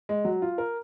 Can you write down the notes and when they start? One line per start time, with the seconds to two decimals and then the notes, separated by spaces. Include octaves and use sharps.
0.09 G#3
0.25 F#3
0.42 F4
0.58 A#4